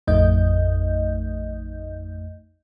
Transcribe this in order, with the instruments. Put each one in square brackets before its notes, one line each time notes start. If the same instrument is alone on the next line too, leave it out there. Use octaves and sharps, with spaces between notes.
[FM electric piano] A1 F2 A3 D#4 D#5 G6